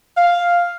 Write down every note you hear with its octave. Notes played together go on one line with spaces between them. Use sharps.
F5